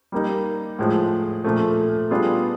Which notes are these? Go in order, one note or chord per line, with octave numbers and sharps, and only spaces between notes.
G3 A#3 D#4
A2 F3 G#3
A#2 F3 A3
G3 B3 D4 F4 G#4